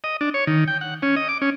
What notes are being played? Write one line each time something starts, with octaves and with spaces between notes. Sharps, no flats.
D#5
D4
C#5
D#3
G5
F#5
C#4
D#5
D6
C#4